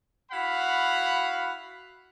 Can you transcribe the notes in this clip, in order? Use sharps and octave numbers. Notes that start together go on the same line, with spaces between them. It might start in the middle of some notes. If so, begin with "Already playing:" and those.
E4 F#4 F5 F#5 B5